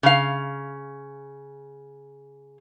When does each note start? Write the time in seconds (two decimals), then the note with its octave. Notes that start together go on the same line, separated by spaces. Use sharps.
0.03 C#3 F5